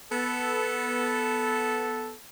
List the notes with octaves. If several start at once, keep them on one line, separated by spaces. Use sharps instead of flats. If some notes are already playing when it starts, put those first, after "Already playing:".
B3 A4